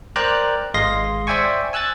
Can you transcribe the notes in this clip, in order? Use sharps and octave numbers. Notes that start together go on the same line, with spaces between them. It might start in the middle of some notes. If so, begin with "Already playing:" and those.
A#4 C5 D5 G5 A#5 F#6
G#1 G#3 D#5 F5 C6 A#6
C5 D5 E5 G5 G#5 C#6
G#5 E6 F#6 G#6 A6